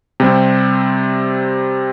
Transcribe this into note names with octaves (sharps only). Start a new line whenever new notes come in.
C3 G3 C4